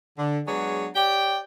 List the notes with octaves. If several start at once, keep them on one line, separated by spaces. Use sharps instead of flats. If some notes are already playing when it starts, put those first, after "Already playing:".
D3
F#3 G#3 B3 D4 G#4 C#5
G4 C#5 D5 G5